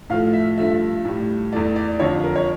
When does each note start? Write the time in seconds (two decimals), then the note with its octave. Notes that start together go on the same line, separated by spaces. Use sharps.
0.09 A2 F3 A3 F5
0.33 E5
0.57 G2 F3 A3 E5
1.05 A2 G3
1.52 E2 E3 A3 D5
1.76 D5
2.00 F2 D3 F3 C#5
2.24 A#4
2.36 C#5